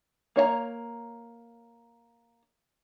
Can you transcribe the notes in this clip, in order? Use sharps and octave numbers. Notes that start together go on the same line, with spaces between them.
A#3 C#5 D#5 A#5